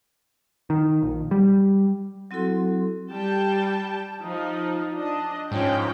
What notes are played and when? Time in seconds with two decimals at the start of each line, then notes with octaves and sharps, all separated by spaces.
0.70 D#3
1.02 A#1
1.31 G3
2.31 F#3 C4 E4 F#4 A4 C6
3.11 G3 G5 A5
4.22 F3 D#4
4.94 D4 D#5
5.52 G#2 F3 C#4 G5